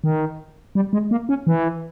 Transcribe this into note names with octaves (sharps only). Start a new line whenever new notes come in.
D#3
G3
G#3
A#3
C#4
E3